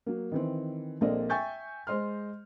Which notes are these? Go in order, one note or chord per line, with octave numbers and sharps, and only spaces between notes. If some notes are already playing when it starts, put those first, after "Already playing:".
F#3 A#3
D#3 E3 C4
A#1 A#3 C4 A4 D5 D#5
E5 G5 G#5 C#6 G6 A6
G#3 C5 D#5 C6 F6